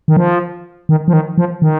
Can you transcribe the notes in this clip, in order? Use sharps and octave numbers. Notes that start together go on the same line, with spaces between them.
D#3
F3
D#3
F3
D#3
F3
D#3